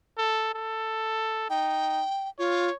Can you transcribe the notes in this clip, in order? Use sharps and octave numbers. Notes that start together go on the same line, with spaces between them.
A4
A4
D#4 G5
F4 C#5